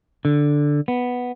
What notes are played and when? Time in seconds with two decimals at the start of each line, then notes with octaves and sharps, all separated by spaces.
0.25 D3
0.88 B3